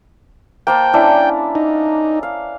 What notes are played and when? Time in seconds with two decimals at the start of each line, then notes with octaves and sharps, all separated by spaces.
0.67 A#3 C5 G5 A5
0.94 C#4 D4 E4
1.55 D#4
2.23 F5